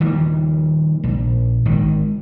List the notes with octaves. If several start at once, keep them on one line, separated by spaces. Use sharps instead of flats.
D#3 F3 G3 A#3
A#1
G#1 D#3